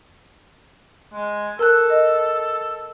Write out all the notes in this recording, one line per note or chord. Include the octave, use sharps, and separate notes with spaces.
G#3
A4 A#4 A5 F#6
D#5